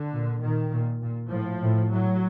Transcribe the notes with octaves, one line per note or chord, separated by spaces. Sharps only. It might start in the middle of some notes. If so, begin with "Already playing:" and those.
Already playing: D3
A#2
A#2 D#3
A#2
A#2
A2 F3
A2
A2 F#3